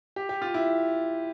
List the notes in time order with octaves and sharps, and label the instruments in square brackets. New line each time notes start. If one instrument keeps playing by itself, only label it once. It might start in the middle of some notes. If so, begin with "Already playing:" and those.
[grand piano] G4
G4
F4
E4